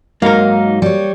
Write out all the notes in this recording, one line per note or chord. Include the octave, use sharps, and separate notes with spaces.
G#2 F#3 A#3 D#4 A#4 F5
G3 C#5